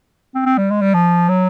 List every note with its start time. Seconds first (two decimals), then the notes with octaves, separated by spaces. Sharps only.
0.35 C4
0.46 C4
0.58 G3
0.70 G#3
0.81 G3
0.94 F3
1.29 F#3